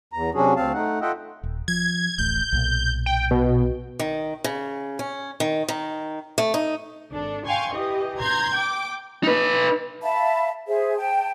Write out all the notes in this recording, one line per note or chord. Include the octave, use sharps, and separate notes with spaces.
E2 A#5
C3 F#3 C#4 D4 F#4 G#4
D2 C4 F5 A5
A3 D#4 F#5
F4 A4 D#5 E5 F#5 G5
D#1
F3 G#6
D1 A1 A2 G6
B1 A#2
G5
B2
D#3
C#3
C#4
D#3
D#3
A3
D#4
G#1 D4 A4
F5 G5 G#5 C6 C#6
E3 G4 D#5
A#5 C6 G6 G#6
G5 D6
D#4 B4
E5 F5 A5 B5
G#4 C5 E5
G5 A5